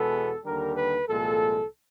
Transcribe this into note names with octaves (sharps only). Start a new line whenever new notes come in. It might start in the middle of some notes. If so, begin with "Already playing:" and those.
Already playing: E2 B2 G#3 B3 A4
D#2 D3 G3 A#4
B4
C2 A#2 F3 G#3 A4